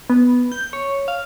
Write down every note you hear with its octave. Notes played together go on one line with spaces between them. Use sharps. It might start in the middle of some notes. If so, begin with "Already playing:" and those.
B3
G6
C#5
F5